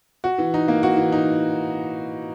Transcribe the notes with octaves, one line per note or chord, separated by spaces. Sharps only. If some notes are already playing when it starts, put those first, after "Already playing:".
F#4
E3
D#4
A#3
F#4
E3
D#4